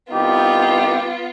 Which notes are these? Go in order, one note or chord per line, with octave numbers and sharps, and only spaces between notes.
C2 B3 D#4 F4 G4